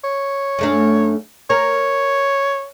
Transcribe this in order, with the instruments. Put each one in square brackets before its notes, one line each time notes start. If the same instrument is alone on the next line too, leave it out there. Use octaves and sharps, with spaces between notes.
[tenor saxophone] C#5
[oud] F#2 A3 D4
[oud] A#4 [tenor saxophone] C#5